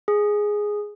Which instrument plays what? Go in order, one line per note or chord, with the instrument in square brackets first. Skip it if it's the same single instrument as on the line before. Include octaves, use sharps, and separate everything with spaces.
[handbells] G#4